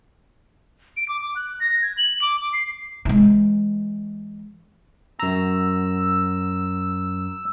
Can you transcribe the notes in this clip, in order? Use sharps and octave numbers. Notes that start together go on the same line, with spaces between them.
D7
D6
D6
F#6
A#6
G#6
F#7
D6
D6
C7
E3 G#3
F#2 A#5 E6